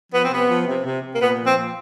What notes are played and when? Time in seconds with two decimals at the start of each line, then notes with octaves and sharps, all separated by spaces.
0.12 F3 B3
0.22 C4
0.30 C3 B3
0.48 F3
0.66 C3
0.84 C3
1.02 C3
1.14 A#3
1.20 A#2 B3
1.38 F3
1.46 C4
1.55 A#2